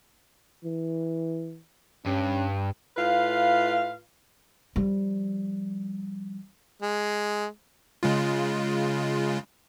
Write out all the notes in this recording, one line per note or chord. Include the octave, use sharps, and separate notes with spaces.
E3
G2 C#4
A2 F4 B4 F5
F3 G3
G#3
C#3 G#3 F4